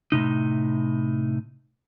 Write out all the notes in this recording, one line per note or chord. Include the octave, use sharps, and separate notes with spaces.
A2 C3 D#4